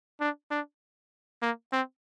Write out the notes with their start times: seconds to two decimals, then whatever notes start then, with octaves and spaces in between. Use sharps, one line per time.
0.21 D4
0.51 D4
1.42 A#3
1.72 C4